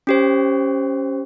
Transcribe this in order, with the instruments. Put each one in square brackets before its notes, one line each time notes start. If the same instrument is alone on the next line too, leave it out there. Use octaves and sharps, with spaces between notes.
[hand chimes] C#4 G4 C5